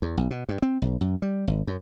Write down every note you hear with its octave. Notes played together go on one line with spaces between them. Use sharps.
E2
B1
B2
G2
C4
B1
F#2
G3
G#1
F#2